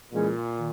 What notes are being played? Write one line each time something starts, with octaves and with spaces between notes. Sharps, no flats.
A#2 E3 G#3 C#4 E4 G#4
D#3